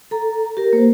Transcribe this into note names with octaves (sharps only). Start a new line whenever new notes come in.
A4 A#5
G4 A#4
A#3 C5